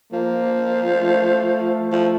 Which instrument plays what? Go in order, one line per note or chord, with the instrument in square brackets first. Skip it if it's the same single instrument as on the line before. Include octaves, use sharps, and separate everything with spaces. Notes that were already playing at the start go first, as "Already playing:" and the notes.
[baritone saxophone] F3 [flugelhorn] A#3
[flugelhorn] A3
[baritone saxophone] F3